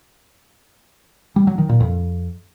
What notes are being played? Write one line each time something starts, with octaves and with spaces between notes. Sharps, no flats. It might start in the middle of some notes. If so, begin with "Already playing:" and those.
G3
F#3
D#3
A#2
F2